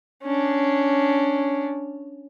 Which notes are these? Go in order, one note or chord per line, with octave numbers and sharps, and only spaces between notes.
C#4 D4